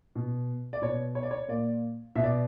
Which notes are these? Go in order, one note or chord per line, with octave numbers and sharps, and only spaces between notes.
B2
D5
B2 C#5
C#5
D5
C#5
A#2 D5
B2 E5
D5